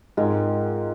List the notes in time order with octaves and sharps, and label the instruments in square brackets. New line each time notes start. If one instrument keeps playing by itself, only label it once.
[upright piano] G#2 [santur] G#3 C4 F4 A#4